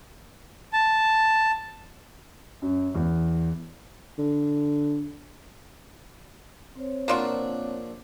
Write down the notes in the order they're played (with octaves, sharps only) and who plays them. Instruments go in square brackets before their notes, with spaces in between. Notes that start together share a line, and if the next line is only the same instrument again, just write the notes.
[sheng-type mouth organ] A5
[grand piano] F#2
E2
[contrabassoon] D3
[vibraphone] C4 C5 C#5
[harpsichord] A#1 D4 E5 [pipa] A#3 F4 F#4